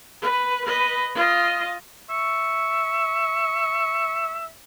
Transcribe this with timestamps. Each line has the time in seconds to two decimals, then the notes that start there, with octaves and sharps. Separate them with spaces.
0.22 B4
0.65 B4 D#5
1.15 F4 D#5
2.10 E5 C#6